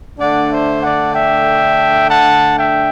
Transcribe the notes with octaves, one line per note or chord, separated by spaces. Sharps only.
D3 A3 D4 D5 F#5
C5 E5
D5 F#5
E5 G5
F#5 A5
E5 G5